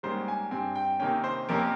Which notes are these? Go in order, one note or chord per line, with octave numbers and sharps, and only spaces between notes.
G#2 G3 A#3 C#4 C5
G#5
G2 G3 C4 G#5
G5
C3 D#3 A#3 C#4 G5
C5
F2 C3 F3 A#3 C#4 A#4